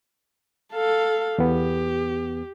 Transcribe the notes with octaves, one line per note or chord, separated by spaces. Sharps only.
A4 F5
E2 B3 G4